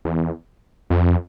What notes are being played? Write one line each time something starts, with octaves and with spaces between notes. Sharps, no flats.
E2
F2